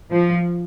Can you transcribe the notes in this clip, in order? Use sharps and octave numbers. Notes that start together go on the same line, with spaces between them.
F3